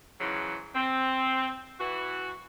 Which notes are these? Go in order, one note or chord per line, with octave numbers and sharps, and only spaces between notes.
G#2 C#3 E3 F#3
C4
E3 F#4